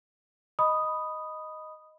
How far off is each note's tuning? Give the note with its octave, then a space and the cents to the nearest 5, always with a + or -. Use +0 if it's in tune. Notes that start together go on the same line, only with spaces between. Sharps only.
D#5 +0 B5 +0 D#6 +0